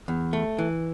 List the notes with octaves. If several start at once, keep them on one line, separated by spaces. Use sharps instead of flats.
E2
A3
E3